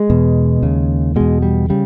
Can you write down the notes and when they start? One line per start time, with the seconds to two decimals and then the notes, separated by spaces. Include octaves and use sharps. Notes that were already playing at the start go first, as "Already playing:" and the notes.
Already playing: G#3
0.10 E2 B2
0.63 D#2 C#3
1.16 E2 B2 G#3
1.42 G3
1.70 C#3 G3